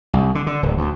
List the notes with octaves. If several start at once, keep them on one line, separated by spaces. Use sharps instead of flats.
C2
D3
D3
D1
D2